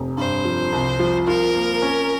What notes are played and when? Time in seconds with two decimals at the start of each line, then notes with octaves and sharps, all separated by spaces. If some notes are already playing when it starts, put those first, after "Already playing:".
Already playing: F1
0.17 G2 C5
0.45 F3
0.73 C2
0.99 F3
1.27 F4 A#4
1.55 A#3
1.82 C#4